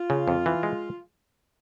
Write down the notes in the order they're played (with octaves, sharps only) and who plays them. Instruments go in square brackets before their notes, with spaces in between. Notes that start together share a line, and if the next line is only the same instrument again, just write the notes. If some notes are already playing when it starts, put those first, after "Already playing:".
Already playing: [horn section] F4
[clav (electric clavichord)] C#3
F2
E3
G#3